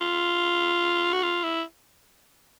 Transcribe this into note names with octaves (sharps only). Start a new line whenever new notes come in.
F4
F#4
F4
E4